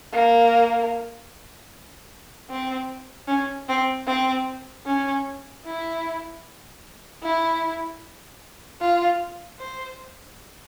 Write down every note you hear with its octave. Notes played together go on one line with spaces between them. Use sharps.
A#3
C4
C#4
C4
C4
C#4
E4
E4
F4
C5